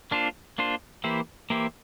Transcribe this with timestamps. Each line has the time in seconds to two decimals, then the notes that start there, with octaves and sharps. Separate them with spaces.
0.11 A#3 D4 F4 C5
0.58 A#3 D4 F4 C5
1.04 E3 A#3 E4 G4 C5
1.50 E3 A#3 E4 G4 C5